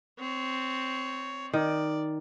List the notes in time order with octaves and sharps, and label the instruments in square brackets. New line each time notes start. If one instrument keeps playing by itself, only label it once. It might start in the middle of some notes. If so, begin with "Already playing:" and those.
[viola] C4 C#5
[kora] D#3 [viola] D5